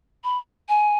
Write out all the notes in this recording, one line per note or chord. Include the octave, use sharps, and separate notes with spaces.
B5
G#5